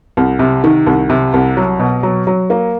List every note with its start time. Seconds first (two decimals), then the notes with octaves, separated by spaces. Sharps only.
0.17 C2
0.39 C3
0.64 D#3
0.87 C2
1.10 C3
1.34 C2
1.57 F#3
1.79 B2
2.03 F#3
2.27 F#3
2.50 A#3